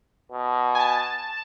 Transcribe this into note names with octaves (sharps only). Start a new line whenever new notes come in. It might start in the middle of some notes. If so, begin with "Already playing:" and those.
B2
G#5
A5